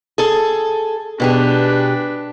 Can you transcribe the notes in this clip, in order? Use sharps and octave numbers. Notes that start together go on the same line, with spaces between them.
G#4 A4
B2 D4 G4 G#4 B4